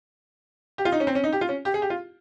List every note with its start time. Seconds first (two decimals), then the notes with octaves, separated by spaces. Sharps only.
0.78 G4
0.85 F4
0.92 D#4
1.00 C#4
1.07 C4
1.15 C#4
1.24 D#4
1.32 G4
1.41 F4
1.49 C#4
1.65 G4
1.74 G#4
1.82 G4
1.90 F4